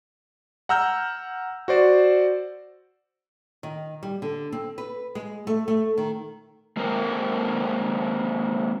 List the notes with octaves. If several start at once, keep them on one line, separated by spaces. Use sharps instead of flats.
F#5 A#5 E6 F6 G6
F#4 C5 D5
D#3
G3
D3
C4
B4
G#3
A3
A3
D#3
G#3 A#3 C4 A#4